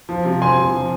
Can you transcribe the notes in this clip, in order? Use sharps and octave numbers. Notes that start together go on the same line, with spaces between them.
F3
C3
F3 G#5 C6
C3
F3